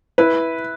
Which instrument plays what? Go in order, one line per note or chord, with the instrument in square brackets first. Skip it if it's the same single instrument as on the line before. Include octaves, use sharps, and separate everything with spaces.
[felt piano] E4 B4